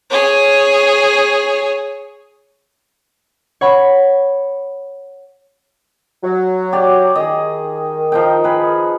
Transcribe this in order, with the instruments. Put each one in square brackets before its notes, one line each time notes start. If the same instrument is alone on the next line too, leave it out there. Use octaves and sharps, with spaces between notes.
[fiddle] G#4 C#5
[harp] C#5 F#5 B5
[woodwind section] F#3
[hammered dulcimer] G4 D5
[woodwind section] D#3 [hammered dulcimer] G#4 D#5
[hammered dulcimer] F3 D#4 G5
G#4 B4